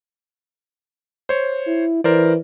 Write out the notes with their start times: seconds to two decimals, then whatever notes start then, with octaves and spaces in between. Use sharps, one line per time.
1.29 C5 C#5
1.67 E4
2.04 E3 A#4 C5 D5